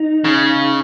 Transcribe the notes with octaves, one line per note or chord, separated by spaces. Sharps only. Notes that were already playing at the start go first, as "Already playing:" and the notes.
Already playing: D#4
C#3